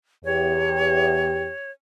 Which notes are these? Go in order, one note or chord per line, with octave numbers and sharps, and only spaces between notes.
E2 G4 C#5